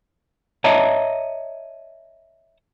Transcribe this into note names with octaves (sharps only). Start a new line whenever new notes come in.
C#5 D#5 E5 A5 A#5